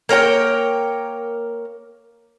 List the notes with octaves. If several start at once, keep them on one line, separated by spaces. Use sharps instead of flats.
A#3 A#4 C#5 G5